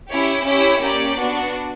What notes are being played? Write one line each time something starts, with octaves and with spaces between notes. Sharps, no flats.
C#4 E4 G4 C#5
C#4 E4 G4 C#5
A#3 C#4 G4 D5
B3 D4 F#4